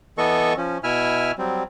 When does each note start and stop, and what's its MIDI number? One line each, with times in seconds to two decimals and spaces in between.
0.18 0.54 52
0.18 0.54 59
0.18 0.54 69
0.18 0.54 75
0.18 0.54 85
0.57 0.78 53
0.57 0.78 61
0.83 1.32 47
0.83 1.32 64
0.83 1.32 76
0.83 1.32 80
0.83 1.32 89
1.38 1.63 54
1.38 1.63 55
1.38 1.63 60